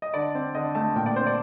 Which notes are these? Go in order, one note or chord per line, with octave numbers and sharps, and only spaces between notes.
D#5
D3 D5
C4
D3 D#5
A3 A5
A#2 G5
D5
C4 C5
D5